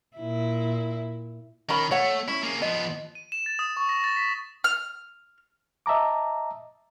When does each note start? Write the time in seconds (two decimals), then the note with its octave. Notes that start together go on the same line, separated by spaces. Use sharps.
0.17 A#2 E4
1.69 D#3 C#4 A#4 B5
1.91 A3 C#5 F#5
2.28 C#4 E4
2.43 A#3 G#4
2.62 F3 B3 D#5
3.15 D#7
3.32 E7
3.46 A6
3.59 D#6
3.77 C#6
3.89 A#6
4.04 A6
4.17 B6
4.64 F6
5.86 D#5 E5 A5 A#5 D6